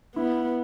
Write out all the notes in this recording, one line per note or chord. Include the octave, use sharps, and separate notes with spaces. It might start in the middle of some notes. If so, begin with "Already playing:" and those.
B3 E4